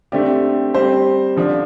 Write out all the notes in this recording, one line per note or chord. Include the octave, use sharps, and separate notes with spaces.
D3 A3 C4 G4 D5
G3 C4 G4 C5
D3 F3 D4